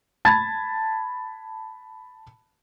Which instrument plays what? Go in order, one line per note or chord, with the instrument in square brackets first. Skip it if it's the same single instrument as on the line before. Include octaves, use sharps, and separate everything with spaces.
[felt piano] A5 B5 G#6 A6